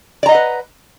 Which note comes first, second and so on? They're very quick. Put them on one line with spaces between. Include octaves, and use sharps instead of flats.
D5 A#5 D#5 F#5 B4